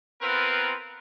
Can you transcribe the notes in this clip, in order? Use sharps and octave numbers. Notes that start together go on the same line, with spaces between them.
B3 C4 F4 A#4 B4